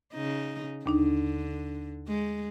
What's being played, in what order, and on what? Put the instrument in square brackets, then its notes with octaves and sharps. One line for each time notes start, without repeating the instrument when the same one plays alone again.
[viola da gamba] C#3 D#4
[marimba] D#2 D4 D#4 [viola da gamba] D3
[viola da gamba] G#3